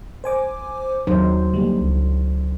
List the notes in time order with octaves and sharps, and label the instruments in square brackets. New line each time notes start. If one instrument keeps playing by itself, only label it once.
[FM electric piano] C5 G#5 D6
[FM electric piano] D#2 [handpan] F#3 D#4 C5
[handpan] D3 [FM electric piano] G3 A#3
[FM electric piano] C#2